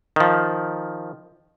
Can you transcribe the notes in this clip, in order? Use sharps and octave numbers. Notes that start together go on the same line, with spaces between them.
D#3 F3